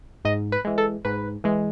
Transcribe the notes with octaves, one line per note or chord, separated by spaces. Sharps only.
G#2 D#5
B4
E3 G#3
A4
G#2 B4
E3 G#3